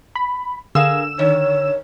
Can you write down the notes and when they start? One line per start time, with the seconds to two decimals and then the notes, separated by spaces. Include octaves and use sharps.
0.15 B5
0.75 D3 G#4 A#4 F5 E6 E7
1.19 D#3 C#5